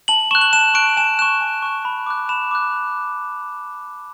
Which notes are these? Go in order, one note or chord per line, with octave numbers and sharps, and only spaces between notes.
A5 F#7
C#6 F#6 E7
F#7
A5 E7
C#6 F#6 D7
G#5 E7
C#6 F#6 E7
G#5
C#6 F#6
B5
D6 F#6
B5 E7
D6 F#6